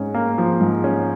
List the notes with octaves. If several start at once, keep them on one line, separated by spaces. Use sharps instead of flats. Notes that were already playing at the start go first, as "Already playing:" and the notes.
Already playing: G#2 C#4
A#3
F3
G#2
C#4